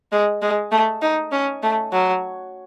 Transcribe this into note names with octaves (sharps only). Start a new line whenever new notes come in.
G#3
G#3
A3
D#4
C#4
A3
F#3